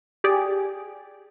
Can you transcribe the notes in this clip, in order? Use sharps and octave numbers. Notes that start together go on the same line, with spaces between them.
G4 G#4 D5